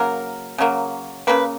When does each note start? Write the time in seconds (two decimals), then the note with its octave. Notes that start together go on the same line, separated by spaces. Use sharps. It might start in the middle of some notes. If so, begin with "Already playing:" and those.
Already playing: C#3 F#3 A#3 A#4
0.58 C#3 F#3 A#3
1.27 C#3 F#3 A#3 B4